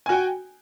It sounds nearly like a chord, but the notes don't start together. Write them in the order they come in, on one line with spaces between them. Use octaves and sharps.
G#5 F#4 G5